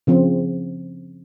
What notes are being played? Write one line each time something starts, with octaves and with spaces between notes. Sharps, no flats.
C#3 F3 C4